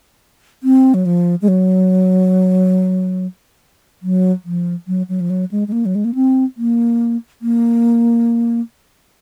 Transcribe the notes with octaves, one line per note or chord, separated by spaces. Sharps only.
C4
F#3
F3
G#3
F#3
F#3
F3
F#3
F#3
F3
F#3
G#3
G#3
A#3
F#3
G#3
A#3
C4
A#3
A#3